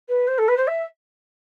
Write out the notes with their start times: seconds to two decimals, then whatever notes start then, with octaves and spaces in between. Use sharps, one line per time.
0.08 B4
0.27 C5
0.38 A4
0.48 B4
0.57 C5
0.67 E5